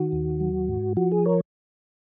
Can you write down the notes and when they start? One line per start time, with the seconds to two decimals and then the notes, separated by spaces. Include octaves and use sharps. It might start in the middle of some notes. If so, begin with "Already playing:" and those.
Already playing: D#3 F#4
0.12 D#2
0.40 F#3
0.69 G#2
0.97 F3 F#4
1.12 G#4
1.26 A#4 C#5